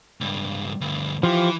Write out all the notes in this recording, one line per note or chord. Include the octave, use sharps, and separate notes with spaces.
C#2 G2
D2 G2
E3 F3 F4 G4